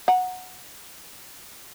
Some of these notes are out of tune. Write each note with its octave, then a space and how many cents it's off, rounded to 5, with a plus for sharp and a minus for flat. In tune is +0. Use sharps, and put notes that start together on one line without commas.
F#5 -10 A#5 +10